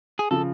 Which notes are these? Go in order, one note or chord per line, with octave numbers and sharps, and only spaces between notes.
G#4
C#3 F3 A4